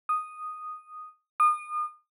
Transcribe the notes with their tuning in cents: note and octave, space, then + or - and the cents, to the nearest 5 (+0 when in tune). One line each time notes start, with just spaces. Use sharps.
D#6 -5
D#6 -35